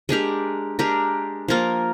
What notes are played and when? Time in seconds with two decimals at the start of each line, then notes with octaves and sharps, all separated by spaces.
0.09 G#3 D4 G4 A#4
0.79 G#3 D4 G4 A#4
1.48 F3 A#3 F4 A#4